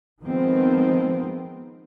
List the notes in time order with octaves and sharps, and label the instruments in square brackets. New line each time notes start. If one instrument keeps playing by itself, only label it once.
[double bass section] D#3 F3 G#3 B3 C4